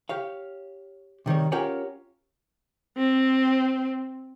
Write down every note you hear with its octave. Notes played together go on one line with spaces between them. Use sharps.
G4 C#5 F5
C3 D#3 G3 C#5
C#4 F4 G4 A#4 C#5 F#5
C4